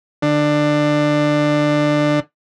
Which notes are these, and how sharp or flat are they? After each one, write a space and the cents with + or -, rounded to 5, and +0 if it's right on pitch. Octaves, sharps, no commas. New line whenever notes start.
D3 +15